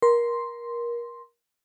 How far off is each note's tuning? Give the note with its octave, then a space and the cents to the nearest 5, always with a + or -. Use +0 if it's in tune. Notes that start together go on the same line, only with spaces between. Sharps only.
A#4 +25 C6 +0